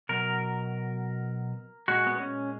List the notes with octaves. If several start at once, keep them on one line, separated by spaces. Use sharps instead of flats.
B2 F#3 A#4
A#2 G#3 F#4
B3
C#4